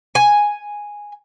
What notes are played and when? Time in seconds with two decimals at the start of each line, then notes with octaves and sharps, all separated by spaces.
0.15 G#5